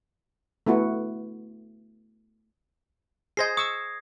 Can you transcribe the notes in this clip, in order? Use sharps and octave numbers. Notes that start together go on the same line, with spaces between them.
A3 B3 E4 F#4
G#4 C5 D#5 G#6 A#6 C7
C#6 D#6 E6